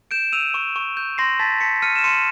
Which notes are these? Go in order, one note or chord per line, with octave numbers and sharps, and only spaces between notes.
G6 D7 E7
E6 D#7 F7
C#6
C#6
G6
C6 A#6 C7
A5 A6 B6
A5 B6 C#7
F6 C#7 D#7
E7
C6 C#7 D#7